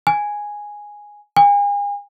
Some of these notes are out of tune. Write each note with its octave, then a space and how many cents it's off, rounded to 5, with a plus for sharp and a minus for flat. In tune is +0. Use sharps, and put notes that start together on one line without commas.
G#5 -5
G#5 -40